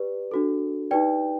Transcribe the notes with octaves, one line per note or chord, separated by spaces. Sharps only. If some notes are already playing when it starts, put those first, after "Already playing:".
Already playing: G4 B4 D5
D4 F#4 A4
D#4 G4 B4 D5 G5